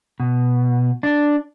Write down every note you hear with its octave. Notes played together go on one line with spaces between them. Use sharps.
B2
D4